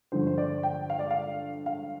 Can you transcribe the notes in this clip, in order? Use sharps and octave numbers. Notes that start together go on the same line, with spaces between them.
G2 D3 F3 C5
C5
D5
G5
F5
D5
F5
F5